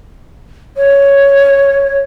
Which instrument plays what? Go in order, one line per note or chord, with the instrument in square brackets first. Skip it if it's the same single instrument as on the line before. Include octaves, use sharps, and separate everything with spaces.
[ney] C#5